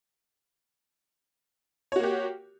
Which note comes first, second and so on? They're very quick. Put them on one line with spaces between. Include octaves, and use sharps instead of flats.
C#5 F#4 A#3 G4